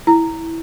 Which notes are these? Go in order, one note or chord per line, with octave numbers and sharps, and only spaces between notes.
E4